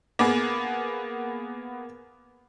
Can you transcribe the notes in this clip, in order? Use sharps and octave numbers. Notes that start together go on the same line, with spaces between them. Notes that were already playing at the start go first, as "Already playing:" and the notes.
A#3 B3 G#4